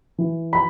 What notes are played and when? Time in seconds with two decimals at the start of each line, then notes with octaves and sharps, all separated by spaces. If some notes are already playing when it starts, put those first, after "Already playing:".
0.18 E3
0.53 B5